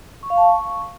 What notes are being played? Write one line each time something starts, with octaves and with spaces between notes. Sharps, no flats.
C#6
F5
A5
C#6